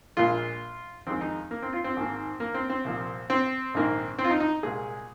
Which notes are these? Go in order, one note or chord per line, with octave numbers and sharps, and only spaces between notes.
A#1 A#2 G#3 F4
F2 D#3 G#3 C4
D#4
A#3
C4
F4
C4
G#1 G#2 D#3 A#3
A#3
C4
C4
C2 A#2 F3
C4
A#1 G#2 D#3 A#3
C4
F4
D#4
D#4
C2 A#2 G#3 G#4